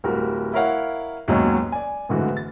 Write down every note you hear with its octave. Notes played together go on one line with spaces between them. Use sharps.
D1 G3 F#4 A#4
E4 A#4 C#5 F5 F#5
D#2 G#2 B2 D#3 F#3 C#4
D5 G#5
D1 G#2 D3 E3 F#4
A6